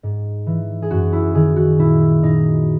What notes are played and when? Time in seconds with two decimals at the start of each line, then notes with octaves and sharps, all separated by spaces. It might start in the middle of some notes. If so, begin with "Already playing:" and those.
0.03 G#2
0.47 E3
0.82 G#4
0.91 F#2 F#4
1.13 E4
1.35 D#3 G#4
1.56 F#4
1.79 A#2 E4
2.23 A#2 D#4